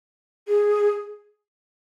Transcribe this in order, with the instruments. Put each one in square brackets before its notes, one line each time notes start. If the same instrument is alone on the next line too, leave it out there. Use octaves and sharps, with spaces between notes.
[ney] G#4